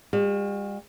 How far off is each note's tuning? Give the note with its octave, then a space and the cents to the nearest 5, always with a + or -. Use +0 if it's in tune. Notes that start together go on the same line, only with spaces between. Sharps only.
G3 +45 F#4 -20